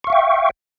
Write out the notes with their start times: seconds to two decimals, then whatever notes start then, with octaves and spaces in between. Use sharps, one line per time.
0.04 C#6
0.07 F5
0.10 E5
0.13 G5